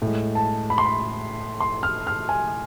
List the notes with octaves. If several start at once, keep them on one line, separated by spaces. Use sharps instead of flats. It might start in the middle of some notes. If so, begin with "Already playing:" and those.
A2 G#3
A5
B5
C6
B5
C6
F6
F6
G#5